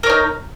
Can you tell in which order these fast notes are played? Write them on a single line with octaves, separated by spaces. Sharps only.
A#4 C#5 D#4